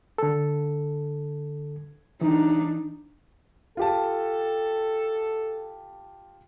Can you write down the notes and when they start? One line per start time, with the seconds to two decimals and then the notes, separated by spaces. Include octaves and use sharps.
0.18 D3 A4
2.21 E3 D4 D#4
3.77 F4 G4 A4 A5